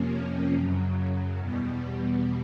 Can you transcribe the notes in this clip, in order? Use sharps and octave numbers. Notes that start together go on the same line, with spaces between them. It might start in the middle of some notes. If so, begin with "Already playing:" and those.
Already playing: F2 C3 F3 A#3 C#4
F#2 C#3 F#3
E2 B2 G3 B3